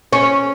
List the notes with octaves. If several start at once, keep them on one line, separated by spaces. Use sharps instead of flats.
C#4